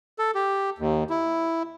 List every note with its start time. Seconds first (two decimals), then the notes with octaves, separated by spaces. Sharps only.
0.19 A4
0.35 G4
0.78 D#2
1.10 E4